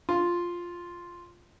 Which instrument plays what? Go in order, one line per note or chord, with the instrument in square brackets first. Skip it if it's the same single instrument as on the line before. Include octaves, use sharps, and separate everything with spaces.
[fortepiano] F4